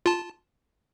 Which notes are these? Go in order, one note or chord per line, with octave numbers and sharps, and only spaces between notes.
F4 A5